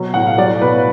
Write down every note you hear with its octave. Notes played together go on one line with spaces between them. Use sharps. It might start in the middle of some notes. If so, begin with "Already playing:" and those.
Already playing: B2 F#3
A2 F#5
F5
F#3 D5
B2 B4